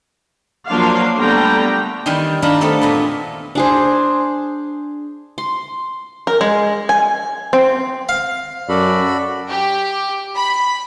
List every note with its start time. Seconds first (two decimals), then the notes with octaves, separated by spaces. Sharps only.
0.67 F3 F#3 A#3 D4 C5 F5
1.19 D3 G3 A3 B3 G5 A#5
2.06 D#3 E3 G3 G5 C6
2.42 D#3 G3 D4 F4 A#5 B5
2.61 A3 B3 C4 A4
2.82 E2 A#2 B3
3.55 D4 G#4 C5
5.38 C6
6.27 A#4
6.41 G#3
6.89 G#5
7.53 C4
8.09 F5
8.69 F#2 F#4 A4 D5 B5
9.47 G4
10.36 B5